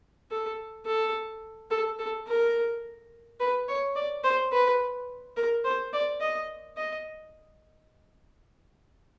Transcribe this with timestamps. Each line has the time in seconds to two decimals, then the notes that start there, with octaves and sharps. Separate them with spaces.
0.31 A4
0.86 A4
1.71 A4
1.99 A4
2.27 A#4
3.40 B4
3.68 C#5
3.96 D5
4.24 C5
4.52 B4
5.36 A#4
5.64 C5
5.93 D5
6.21 D#5
6.77 D#5